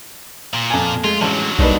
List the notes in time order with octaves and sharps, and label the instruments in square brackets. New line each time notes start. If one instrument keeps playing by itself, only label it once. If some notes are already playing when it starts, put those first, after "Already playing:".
[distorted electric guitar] A#2
[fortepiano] F2 G#5
[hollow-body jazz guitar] G#3 A3 G#4 [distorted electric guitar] F4
[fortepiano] A1 [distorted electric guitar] D3 F#3
[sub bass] B1 [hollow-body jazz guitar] G3 A#3 [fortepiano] B3 D4 D#4